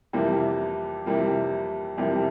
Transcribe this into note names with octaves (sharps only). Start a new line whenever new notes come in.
F2 C3 E3 G3 A#3
F2 C3 E3 G3 A#3
F2 C3 E3 G3 A#3